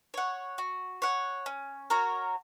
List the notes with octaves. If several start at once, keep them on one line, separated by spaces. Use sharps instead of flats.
C#5 F#5
F#4
C#5 F#5
C#4
F#4 A#4 C#5